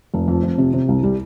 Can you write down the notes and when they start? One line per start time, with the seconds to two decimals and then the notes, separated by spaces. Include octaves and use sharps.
0.14 F1
0.28 F2
0.43 F2
0.58 C3
0.74 C3
0.88 C2
1.03 G3